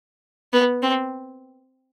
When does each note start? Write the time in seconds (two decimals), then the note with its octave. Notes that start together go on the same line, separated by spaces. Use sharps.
0.53 B3
0.82 C4